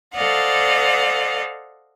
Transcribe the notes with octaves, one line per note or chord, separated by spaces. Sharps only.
A4 C5 D5 D#5 F5 F#5